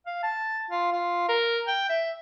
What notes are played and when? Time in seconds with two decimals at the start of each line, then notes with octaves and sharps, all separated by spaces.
0.07 F5
0.23 A5
0.70 F4
0.92 F4
1.29 A#4
1.67 G5
1.89 E5